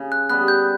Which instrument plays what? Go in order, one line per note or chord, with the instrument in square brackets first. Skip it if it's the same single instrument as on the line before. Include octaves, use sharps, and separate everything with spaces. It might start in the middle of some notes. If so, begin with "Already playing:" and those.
Already playing: [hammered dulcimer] C#3
[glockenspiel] F#6
[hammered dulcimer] G3 B3 [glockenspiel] F#6
[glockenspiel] G6